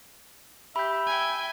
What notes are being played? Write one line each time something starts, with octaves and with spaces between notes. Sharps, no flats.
G4 E5 B5 G6
G5 G#5